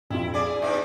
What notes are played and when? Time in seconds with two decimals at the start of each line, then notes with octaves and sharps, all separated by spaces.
0.10 A#1 F2 E4 F4
0.34 G#4 D5
0.62 B2 D4 D#4 E5